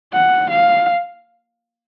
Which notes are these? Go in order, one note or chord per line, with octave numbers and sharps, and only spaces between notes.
F#5
F5